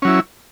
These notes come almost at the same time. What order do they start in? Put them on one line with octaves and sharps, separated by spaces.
C#4 F#3 E4